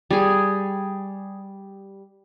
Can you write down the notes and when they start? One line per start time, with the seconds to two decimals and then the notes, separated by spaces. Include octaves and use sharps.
0.11 G3 G#4